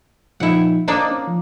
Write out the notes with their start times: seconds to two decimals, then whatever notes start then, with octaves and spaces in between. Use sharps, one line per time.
0.40 A#2 F3 D#4 E4 F#5
0.88 A#3 D4 D#4 C5 D#5
1.11 C#4
1.27 F3